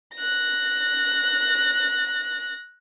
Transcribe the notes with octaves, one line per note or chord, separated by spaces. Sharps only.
F#6 A#6